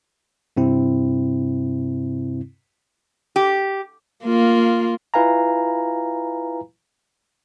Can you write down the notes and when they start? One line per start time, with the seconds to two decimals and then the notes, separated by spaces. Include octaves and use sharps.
0.57 G2 C3 C4 E4
3.36 G4
4.24 A#3 F4
5.14 E4 F4 B4 F5 G#5 A#5